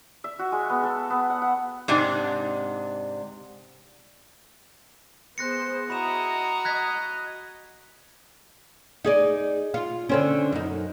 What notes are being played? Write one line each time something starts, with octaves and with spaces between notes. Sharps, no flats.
E5
F#4
G#3
B3
A4
B3
F#5
F#5
G#2 C3 D4
B3 G#4 C5 F#6 A#6 C#7
E4 F#4 D#5 A#5 B5 E7
D#5 F#6 G#6 B6
D#4 G#4 D5
F4
D3 C4 C#4
F#2 D#4